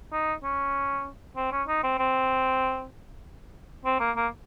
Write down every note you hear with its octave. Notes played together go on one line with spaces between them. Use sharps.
D#4
C#4
C4
C#4
D#4
C4
C4
C4
A#3
A#3